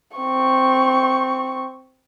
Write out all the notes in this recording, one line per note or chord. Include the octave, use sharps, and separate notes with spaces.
C4 C#6